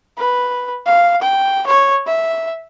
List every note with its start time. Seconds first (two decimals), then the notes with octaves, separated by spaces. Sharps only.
0.18 B4
0.86 F5
1.22 G5
1.67 C#5
2.07 E5